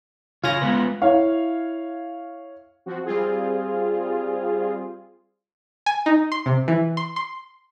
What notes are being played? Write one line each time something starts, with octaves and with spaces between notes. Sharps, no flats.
C#3 F4 C#5 G#5 A#6
G#3 B3 B4
E4 C#5 F5
F3 C4 F#4
G3 C4 F4 G#4
G#5
D#4
C6
C3
E3
C6
C6